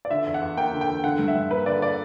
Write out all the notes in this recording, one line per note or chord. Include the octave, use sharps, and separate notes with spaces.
D5
D3 E5
E2
F#5
E2
A#3 G5
D3
G5
E2
D3 F#5
G2
E5
G2
A#3 B4
D3 D5
D5